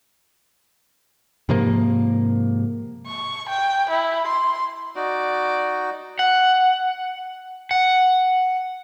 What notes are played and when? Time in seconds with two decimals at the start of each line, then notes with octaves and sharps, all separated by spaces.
1.49 G#2 C3 F3 A#3
3.07 C#6
3.49 G5
3.90 E4
4.28 C6
4.96 D#4 F#4 D5
6.19 F#5
7.71 F#5